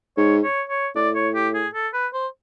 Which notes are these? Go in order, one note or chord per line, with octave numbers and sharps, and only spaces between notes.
G#2 C#5
C#5
C#5
A2 D5
C#5
G4
G#4
A4
B4
C5